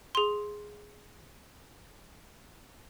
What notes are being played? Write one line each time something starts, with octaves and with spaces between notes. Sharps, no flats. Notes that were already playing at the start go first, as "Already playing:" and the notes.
G#4 C6